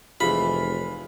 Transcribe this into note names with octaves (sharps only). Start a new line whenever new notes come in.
F1 E3 G#3 F4 B5